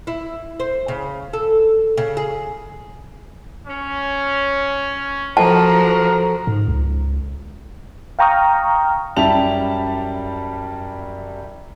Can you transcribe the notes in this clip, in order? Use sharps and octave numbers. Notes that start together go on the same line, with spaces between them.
E4
C5
C#3
A4
C#3
G#4
C#4
F3 F#4 A4 A#4 C5 A5 A#5
G#2
C#2
F5 G5 A#5 C#6 D#6 F6
F#2 G3 E4 G4 A5 F7